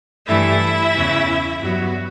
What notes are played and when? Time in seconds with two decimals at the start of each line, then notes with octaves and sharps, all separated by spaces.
0.27 G2 E3 A3 E4 E5
0.93 E2 C#3 E3
1.59 G2 F#3 B3 F#4